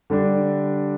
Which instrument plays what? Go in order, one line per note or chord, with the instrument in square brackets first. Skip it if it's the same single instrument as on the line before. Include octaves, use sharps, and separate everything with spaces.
[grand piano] D3 G3 D4